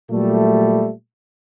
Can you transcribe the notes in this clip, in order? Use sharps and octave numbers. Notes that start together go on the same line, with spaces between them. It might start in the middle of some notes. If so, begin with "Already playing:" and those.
A#2 F#3 G3 A3